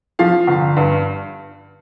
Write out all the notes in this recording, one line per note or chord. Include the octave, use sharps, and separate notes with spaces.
F3 F5
G1
G2